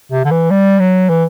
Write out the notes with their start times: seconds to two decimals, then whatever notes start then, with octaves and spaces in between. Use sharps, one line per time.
0.12 C3
0.25 D3
0.31 E3
0.51 G3
0.79 F#3
1.09 E3